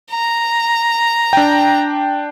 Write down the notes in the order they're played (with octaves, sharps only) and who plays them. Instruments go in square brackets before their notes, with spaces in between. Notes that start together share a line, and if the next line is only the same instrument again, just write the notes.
[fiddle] A#5
[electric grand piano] D4 G5